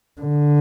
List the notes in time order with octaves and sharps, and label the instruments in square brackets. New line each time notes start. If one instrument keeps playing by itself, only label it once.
[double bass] D3